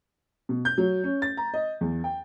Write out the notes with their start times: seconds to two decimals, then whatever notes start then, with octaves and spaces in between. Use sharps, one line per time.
0.49 B2
0.65 G6
0.78 F#3
1.04 C#4
1.22 A6
1.37 A#5
1.54 D#5
1.81 E2
2.04 G5